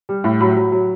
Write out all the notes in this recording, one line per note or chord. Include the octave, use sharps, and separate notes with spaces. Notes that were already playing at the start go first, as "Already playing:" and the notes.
G3
A2
F#3 B5
F#3
F#3